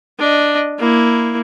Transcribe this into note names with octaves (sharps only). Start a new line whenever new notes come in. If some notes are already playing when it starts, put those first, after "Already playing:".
D4 D#5
A#3 E4